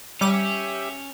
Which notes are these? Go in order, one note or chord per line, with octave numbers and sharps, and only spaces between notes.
G3 C#4 G4 E5 D6 D#7